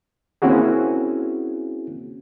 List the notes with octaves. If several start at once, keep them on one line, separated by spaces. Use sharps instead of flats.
A#3 C4 C#4 E4 F#4 G#4